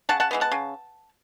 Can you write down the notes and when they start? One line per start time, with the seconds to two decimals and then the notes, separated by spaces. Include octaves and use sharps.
0.09 C#3 F#5 A5
0.20 F#5 A5
0.31 E3 G#3 B3
0.41 F#5 A5
0.52 C#3